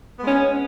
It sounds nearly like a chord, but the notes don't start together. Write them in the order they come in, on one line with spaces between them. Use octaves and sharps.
B3 G#3 C#4